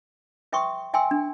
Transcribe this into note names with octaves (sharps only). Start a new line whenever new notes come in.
B4 E5 G5 C6 C#6 D#6
E5 G5 G#5 C6 E6
D4